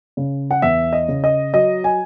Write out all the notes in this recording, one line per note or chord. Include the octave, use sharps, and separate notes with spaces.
C#3
F#5
E2 E5
D#5
C#3
D#5
F#3 D#5
G#5